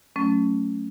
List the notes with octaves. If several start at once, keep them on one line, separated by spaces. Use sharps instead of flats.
F#3 A3 C#4